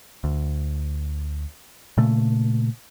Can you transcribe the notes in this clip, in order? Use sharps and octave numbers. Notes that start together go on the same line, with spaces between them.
D2
A#2 C#3 A3